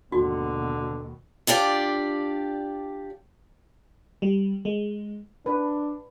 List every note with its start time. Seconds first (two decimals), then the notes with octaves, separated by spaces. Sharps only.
0.12 D#2 G#2 B2 D3 F#4
1.47 D4 F4 G4 D5
4.22 G3
4.65 G#3
5.46 D4 B4